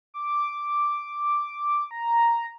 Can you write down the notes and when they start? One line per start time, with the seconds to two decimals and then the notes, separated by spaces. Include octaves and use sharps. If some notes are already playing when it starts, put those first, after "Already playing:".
0.14 D6
1.91 A#5